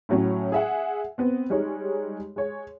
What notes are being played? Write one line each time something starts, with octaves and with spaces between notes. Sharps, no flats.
A2 F#3 C#4
G#4 E5 F#5
B3 C4
G3 G#3 D#4 C#5
G#3 C#5